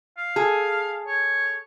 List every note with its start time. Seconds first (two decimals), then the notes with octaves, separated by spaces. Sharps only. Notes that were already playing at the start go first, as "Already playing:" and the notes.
0.18 F5
0.36 G#4 A4
1.07 C#5